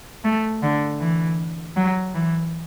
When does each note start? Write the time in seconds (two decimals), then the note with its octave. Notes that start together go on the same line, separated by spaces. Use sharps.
0.24 A3
0.63 D3
1.00 E3
1.76 F#3
2.14 E3